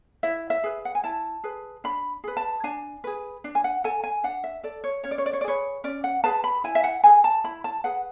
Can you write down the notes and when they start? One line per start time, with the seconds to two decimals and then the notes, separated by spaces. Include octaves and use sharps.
0.23 E4 E5
0.50 E5
0.64 G#4 B4
0.85 F#5
0.95 G#5
1.04 E4 A5
1.44 G#4 B4
1.84 D4 B5
2.24 G#4 B4
2.37 A5
2.64 D4 G#5
3.04 G#4 B4
3.44 D4
3.55 G#5
3.64 F#5
3.84 A4 G#5
4.04 G#5
4.24 D4 F#5
4.44 E5
4.63 A4 D5
4.84 C#5
5.04 C#4 C#5
5.11 D5
5.18 C#5
5.26 D5
5.33 C#5
5.41 D5
5.44 G#4 B4 C#5
5.84 C#4 D5
6.04 F#5
6.24 G#4 B4 A5
6.44 B5
6.64 E4 G#5
6.75 E5
6.84 F#5
7.04 G#4 B4 G#5
7.24 A5
7.44 E4 B5
7.64 A5
7.84 G#4 B4 F#5